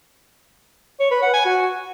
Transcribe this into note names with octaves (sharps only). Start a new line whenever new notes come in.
C#5
B4
F#5
G#5
F#4